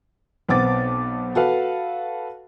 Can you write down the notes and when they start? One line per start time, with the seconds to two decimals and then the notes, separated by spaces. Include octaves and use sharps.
0.48 B1 B3 C4 D6 A6
1.35 F#4 A4 B4 F5